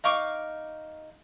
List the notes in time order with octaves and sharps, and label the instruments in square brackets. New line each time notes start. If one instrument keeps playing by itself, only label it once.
[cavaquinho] D#4 F5 C#6 D6